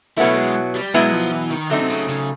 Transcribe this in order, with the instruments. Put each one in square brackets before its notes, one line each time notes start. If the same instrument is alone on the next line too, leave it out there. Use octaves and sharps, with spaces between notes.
[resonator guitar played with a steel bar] B2 F#3 B3 E4 [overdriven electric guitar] A3
[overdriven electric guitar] G#3
G3
[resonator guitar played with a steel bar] B2 F#3 B3 E4 [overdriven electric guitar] G#3
[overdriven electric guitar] F3
E3
D#3
[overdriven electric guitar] D3 [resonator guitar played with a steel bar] F#3 A3 C4 D#4
[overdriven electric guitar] C3
C#3
C#3